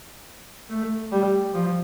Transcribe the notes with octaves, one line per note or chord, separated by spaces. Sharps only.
A3
G3
F3